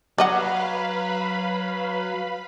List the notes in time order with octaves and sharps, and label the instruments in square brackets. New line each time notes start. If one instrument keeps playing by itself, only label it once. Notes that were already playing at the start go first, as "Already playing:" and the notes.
[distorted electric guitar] F#3 [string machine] B4 F5 B5 [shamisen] D5 D#5 F#5